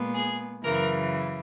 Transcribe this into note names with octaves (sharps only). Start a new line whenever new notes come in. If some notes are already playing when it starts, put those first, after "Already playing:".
Already playing: A#2 G#3 B3
G#4
F#2 C#3 E3 A#4